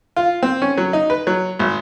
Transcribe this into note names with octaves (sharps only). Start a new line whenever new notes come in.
F4
C4
C#4
F#3
D#4
B4
F#3
G#1